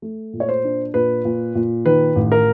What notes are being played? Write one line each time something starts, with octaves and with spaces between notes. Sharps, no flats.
A3
A#2
C#5
C5
D4
A#2 B4
A#2
A#2
D#3 B4
A1
A#4